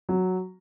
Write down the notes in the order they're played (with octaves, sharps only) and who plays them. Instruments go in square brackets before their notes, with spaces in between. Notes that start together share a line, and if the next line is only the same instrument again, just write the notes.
[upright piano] F#3